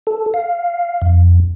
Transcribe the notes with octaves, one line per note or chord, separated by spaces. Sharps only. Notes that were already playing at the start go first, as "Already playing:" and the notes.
A4
F5
F2